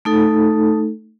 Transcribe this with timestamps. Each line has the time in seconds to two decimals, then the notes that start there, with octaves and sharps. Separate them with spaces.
0.05 A3 D#4 A4